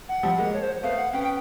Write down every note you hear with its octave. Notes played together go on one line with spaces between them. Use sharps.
F#5
F3 G3
G#3 A#3
C#5
C5
A3 B3 F5
F#5
B3 C#4 G5
G5